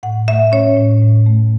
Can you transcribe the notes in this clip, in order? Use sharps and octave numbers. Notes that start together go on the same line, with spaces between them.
A2 F#5
A3 E5
C#4 C#5
A2
A2
A3